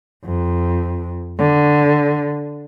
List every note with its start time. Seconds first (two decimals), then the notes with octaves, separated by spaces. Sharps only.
0.25 F2
1.38 D3